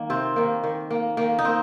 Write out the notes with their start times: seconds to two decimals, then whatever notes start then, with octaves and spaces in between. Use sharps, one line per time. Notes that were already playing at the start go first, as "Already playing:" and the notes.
Already playing: D#3 A#3
0.10 C3 C4
0.36 D#3 A#3
0.64 D#3
0.91 A#3
1.17 D#3 A#3
1.39 D#4
1.45 A#3 C4